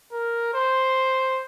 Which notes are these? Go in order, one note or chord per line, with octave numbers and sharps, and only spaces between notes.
A#4
C5